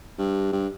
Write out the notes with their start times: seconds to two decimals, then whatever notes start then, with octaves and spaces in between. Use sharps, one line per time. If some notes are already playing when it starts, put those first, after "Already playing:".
0.18 G2
0.52 G2